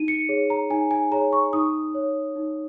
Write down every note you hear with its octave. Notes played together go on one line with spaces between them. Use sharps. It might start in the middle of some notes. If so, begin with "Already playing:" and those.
Already playing: D#4 D#7
C#7
G#4 C#5
A#5
D#4 G#5
G#5
G#4 C#5 A#5
C#6
D#4 D#6
C#5
D#4